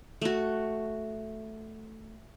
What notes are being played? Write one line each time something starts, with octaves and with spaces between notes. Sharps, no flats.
A3 F#4